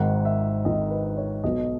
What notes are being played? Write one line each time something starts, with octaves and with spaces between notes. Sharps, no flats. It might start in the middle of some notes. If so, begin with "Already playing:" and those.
Already playing: G#1 G#2 D#3 F#5
E5
G#1 G#2 D#3 D#5
B4
C#5
B1 B2 F#3 B3 D#5